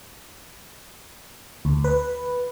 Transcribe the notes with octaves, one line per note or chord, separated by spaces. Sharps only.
D2
B4